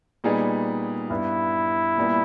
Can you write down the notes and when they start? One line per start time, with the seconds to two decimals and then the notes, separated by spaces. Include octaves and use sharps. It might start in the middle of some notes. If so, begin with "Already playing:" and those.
0.24 A#2 G3 B3 D#4 G#4
1.10 G2 G3 B3 E4
1.97 A#2 G3 B3